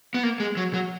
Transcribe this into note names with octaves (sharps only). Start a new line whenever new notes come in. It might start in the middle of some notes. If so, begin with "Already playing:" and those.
B3
A#3
G#3
F#3
F#3